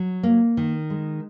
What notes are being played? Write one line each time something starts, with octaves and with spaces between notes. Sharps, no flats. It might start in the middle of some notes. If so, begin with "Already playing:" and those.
Already playing: F#3
A#3
D#3
G#3